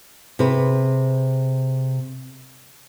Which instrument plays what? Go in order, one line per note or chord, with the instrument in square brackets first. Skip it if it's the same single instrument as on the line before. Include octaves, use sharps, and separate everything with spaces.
[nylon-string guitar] C3 G#4 B4